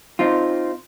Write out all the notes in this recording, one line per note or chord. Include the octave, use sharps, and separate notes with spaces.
C4 D#4 F4